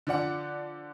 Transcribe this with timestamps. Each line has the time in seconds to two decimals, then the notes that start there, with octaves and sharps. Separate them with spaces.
0.07 D3 F3 D5 F#5